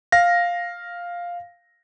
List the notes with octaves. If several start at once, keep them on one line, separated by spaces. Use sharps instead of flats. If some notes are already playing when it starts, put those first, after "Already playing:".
F5 A#6